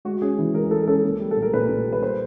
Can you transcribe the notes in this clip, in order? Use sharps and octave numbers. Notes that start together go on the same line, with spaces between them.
G#3 F#4
C#4 G#4
E3
G#3 A#4
G#3 A4
C#4 A4
A#3
G3
A4
A#2
A#4
A#2 B4
A#2
G3
B4
A#3 C5